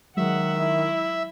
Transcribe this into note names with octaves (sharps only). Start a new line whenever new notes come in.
D#3 F#3 G#3 E5 F#5
E4